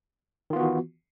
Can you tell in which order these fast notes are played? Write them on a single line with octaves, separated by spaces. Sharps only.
D#3 F4 B3 F#4 E3